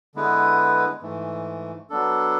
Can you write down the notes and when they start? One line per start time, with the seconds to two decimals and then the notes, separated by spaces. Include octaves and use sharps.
0.15 D3 G#3 B3 E4 B4
1.02 G#2 E3 A3
1.90 F#3 B3 D4 A4